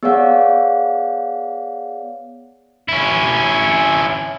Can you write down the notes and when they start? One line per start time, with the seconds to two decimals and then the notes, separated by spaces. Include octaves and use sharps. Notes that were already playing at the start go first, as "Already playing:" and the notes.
0.03 B3 G#4 C#5 D5 F5 F#5
2.88 C#4 E4